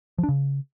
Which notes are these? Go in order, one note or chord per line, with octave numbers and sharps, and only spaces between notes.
F3
D4
C#3